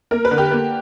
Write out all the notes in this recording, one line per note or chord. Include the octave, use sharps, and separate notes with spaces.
A#3 A#4
B4
D3
G4
A#3